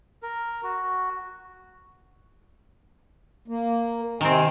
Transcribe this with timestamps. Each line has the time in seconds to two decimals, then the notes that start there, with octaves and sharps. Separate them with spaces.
0.23 A#4
0.63 F#4
3.48 A#3
4.21 C3 D#3 C4 G#5